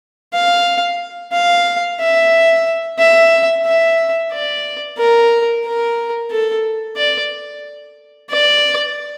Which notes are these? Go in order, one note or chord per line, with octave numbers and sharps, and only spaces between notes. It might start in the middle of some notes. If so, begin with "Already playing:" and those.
F5
F5
E5
E5
E5
D5
A#4
A#4
A4
D5
D5